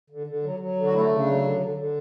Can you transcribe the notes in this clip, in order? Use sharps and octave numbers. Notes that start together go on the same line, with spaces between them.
D3
D3
F#3
F#3
D3
F#4
A3 E4
C#3
D4
F#3
D3
D3
D3